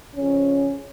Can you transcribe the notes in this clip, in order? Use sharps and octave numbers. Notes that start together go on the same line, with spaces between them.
F2 C#3 F3 C#4